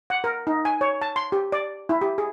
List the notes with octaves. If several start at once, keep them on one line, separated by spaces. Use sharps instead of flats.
F#5
A#4
D#4
G#5
C#5
A5
C6
G4
D5
E4
G4
G#4